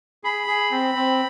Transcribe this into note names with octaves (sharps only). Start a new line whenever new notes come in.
G#4 B5
G#4
C4
C4